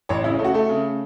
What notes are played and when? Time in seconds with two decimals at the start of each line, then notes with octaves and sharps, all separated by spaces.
0.09 A1 C#5
0.24 C#3 E4
0.34 C#4
0.39 A3
0.44 F#4
0.54 A3 A4
0.69 C#3